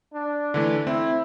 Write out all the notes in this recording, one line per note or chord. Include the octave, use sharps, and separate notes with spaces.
D4
D3 E3 A3
C4 E4